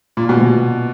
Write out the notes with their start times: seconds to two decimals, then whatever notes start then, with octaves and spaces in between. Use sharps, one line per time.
0.17 A#2
0.29 B2
0.42 B2